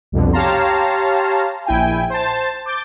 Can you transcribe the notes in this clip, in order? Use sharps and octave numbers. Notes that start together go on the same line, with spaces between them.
C2 F2 B2 D3
G4 C#5 F5 A5 A#5 C6
A#1 E4 G5 G#5
C5 A5
D6 G6 A6